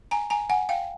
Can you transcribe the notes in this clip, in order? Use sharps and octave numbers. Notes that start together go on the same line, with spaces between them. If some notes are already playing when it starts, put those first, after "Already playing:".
G#5 A#5
G#5 A#5
F#5 G#5
F5 G5